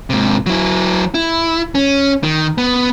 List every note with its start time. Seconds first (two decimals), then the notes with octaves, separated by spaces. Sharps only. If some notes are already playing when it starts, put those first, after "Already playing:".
0.10 G#2 C3
0.46 F#3 E4
1.14 E4
1.75 C#4
2.24 D#3
2.58 B3